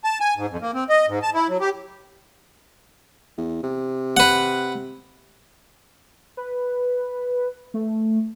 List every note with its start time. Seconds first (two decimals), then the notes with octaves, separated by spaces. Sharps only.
0.04 A5
0.20 G#5
0.37 G#2
0.50 F2
0.62 A#3
0.74 C4
0.89 D#5
1.08 G#2
1.22 A5
1.34 E4
1.49 F#3
1.60 G4
3.38 E2
3.63 C3
4.17 B4 F#5
6.37 B4
7.74 A3